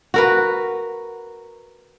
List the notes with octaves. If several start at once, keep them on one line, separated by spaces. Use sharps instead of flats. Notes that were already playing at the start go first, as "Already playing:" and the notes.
F#4 A#4 B4